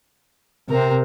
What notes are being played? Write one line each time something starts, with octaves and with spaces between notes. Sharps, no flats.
C3 C4 A#4